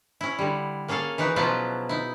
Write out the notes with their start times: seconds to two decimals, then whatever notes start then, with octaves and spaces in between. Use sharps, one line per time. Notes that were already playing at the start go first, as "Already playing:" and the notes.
0.21 C#4 E4
0.38 D3 G3
0.88 A#3 C#4 G#4 A4 F5
1.18 E3 D#4 F#4 B4
1.36 B2 F3 F#3 E4 F4 B4
1.89 D#4 E4